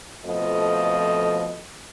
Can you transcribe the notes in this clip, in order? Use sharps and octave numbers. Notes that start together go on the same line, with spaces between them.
F2 B2 F3 A3 D#5